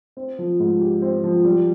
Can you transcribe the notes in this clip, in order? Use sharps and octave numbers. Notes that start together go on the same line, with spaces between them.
C4
F3
G#2
G4
C4
F3
G3